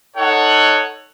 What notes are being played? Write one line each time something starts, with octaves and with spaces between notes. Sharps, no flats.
D#4 A4 C#5 F#5